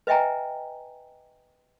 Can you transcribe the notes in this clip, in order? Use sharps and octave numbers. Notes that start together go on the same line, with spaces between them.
B4 D#5 E5 G5 G#5 A#5